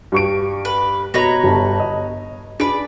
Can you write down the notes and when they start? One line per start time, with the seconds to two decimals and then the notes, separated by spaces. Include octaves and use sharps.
0.12 G2 C#6 D7
0.65 B4
1.14 B2 B4 C#5 D#5 A#5 A#6
1.44 G1 G2 A5
1.80 D#5
2.60 D4 G#4 B4 D5 D7